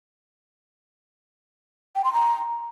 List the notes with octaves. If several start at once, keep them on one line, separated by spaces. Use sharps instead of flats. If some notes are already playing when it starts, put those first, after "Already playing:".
G5
C6
A#5